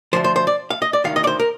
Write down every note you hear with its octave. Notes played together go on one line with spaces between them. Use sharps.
D2 C3 F3 C5
C5
C5
D5
F5
D#5
D5
D2 C3 D#3 F5
D#5
D5
C5
A#4